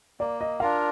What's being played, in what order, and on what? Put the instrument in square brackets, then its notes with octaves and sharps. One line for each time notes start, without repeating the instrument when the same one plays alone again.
[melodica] A#3 [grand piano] D5
[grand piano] D#5
[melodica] D4 F4 A#4 [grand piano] F5